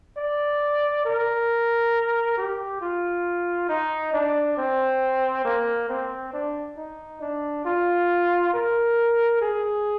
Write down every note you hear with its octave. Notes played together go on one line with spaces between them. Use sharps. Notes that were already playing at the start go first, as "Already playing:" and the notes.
D5
A#4
G4
F4
D#4
D4
C4
A#3
C4
D4
D#4
D4
F4
A#4
G#4